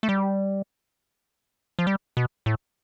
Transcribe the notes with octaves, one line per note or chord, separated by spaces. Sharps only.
A3
G3
F3
G3
B2
A2